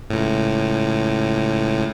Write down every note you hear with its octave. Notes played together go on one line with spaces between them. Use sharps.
C#2 A2